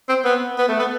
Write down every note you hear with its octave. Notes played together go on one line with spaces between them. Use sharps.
C4
B3
B3
A3
B3